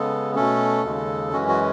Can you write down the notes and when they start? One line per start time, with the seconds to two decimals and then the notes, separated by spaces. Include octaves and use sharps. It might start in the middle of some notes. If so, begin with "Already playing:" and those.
Already playing: C#3 G#3 B3 A4
0.35 B2 A3 C#4 A4
0.84 D#2 C#3 G#3
1.32 F#2 E3 G#3 C#4 F#4
1.48 F#4